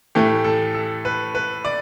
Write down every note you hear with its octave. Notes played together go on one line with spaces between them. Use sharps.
A2 E3 A3 G4
A4
A4
B4
B4
D5